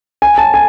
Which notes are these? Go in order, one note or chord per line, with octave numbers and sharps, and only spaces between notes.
G#5
A5
G#5